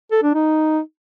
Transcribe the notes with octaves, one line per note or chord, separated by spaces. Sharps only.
A4
D4
D#4